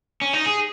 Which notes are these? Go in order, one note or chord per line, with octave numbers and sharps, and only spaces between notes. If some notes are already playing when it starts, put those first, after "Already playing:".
C#4
D#4
G#4